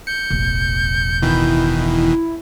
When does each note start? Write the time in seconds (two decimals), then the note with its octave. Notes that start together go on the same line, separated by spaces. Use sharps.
0.07 G6 C#7
0.30 E1 A1
1.22 B2 D#3 E3 E4